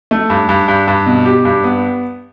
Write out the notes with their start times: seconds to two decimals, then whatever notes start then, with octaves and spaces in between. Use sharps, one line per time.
0.11 A3
0.30 G2
0.49 G2
0.68 G2
0.88 G2
1.06 B2
1.26 G4
1.45 G2
1.64 B3